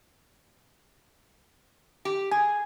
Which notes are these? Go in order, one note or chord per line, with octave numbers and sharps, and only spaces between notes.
G4
G#4 G#5